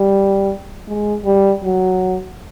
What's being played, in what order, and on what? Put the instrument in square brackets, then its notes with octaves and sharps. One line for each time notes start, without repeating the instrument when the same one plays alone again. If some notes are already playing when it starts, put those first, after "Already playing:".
Already playing: [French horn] G3
G#3
G3
F#3